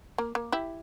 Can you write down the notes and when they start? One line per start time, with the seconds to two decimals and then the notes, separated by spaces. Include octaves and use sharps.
0.18 A#3
0.35 A#3
0.52 E4 G4